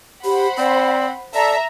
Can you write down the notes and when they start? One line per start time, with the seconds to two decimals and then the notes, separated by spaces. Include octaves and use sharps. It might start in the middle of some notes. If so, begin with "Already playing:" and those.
0.25 G4 C5 F#5 B5
0.58 C4 D5
1.34 A4 D5 E5 A#5